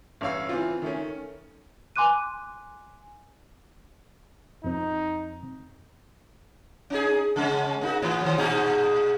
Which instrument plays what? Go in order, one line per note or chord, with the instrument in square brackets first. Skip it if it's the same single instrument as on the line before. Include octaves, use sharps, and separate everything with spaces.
[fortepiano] A1 G2 C#5 F5 E6
E3 C4 F4
D#3 A3 C#4
[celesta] G#5 C6 D6 F#6 D#7
[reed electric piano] F2 C4 [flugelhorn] D#4
[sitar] C#4 D#4 G#4
C#3 G#3 C#4
A#3 D#4 F#4
A2 E3 C#5
D#3 F#3
A#2 D#4 G#4